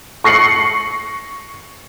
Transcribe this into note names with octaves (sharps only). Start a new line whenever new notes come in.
C#6 A#6 C7 C#7 F#7